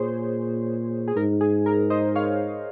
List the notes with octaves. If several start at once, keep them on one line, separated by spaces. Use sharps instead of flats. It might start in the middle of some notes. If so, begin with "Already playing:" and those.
Already playing: A#2 G#4 C5 C#5
G#4
G#2 A#4
G#4
A#4
C5 D#5
C#5 F5